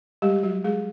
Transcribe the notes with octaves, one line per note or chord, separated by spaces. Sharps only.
G3 G#3 G4
G4
F#3 F#4
G#3 G#4